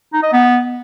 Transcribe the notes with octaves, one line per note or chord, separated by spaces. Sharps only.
D#4
D#5
B3